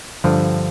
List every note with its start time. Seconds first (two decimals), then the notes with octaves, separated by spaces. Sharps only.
0.24 G2 D3 F3